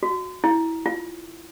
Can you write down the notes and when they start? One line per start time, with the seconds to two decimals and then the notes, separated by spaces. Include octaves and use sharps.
0.03 F#4
0.44 E4
0.86 F4